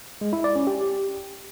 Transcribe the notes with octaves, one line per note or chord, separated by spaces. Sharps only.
G#3
E4
D5
C#4
G4